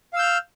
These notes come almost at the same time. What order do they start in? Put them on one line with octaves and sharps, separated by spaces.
F5 E6 G6 F6